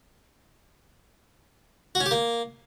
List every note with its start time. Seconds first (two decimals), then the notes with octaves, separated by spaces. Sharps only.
1.95 F#4
2.00 C#4
2.06 G4
2.11 A#3